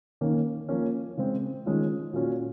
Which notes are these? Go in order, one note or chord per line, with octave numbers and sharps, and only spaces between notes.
D#3 A#3 C#4
F3 A#3 C#4
C#3 G#3 C4
D#3 G#3 C#4 F4
A#2 F#3 C#4 F4